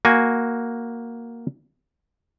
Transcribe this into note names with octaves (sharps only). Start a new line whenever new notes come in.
A#3 F#4 G#5